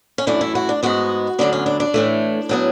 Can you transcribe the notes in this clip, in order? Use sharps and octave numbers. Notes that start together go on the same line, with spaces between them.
C#4
F#2 E3 A3 D4
E4
F#4
D4
G#2 G#3 B3 F#4
D2 D3 F#3 B3 D4
C#4
D4
D4
A2 E3 A3
A2 F#3 B3